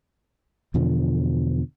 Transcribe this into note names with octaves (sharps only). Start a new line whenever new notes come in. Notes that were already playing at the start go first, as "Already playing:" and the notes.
E2 B2 D3 F3